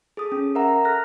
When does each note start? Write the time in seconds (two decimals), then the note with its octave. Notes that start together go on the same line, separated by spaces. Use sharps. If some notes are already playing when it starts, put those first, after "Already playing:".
0.17 G#4 A4 D#6
0.32 C#4
0.55 A#4 E5 F#5 A#5
0.85 A4 F6 F#6 A#6